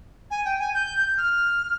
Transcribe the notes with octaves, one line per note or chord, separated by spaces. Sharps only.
G#5
G5
G#5
G6
F6